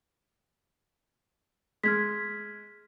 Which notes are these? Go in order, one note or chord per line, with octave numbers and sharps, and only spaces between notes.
G#3 F6 G#6 B6